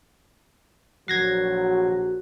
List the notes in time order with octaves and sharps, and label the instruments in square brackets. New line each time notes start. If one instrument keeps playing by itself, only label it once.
[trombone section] A#1 F#3 [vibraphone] F#4 [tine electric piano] G#6 A#6 C7